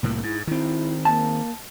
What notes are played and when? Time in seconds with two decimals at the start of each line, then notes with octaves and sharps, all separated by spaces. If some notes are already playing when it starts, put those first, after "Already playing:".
0.03 C2 A2 A#3
0.23 G#2 E4
0.47 D#3 C4 E4
1.05 A#3 A5